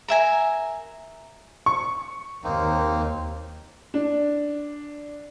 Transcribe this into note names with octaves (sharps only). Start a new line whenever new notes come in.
A#4 E5 G#5 A#5
C#6
D#2 A#3 C4 D#4
D4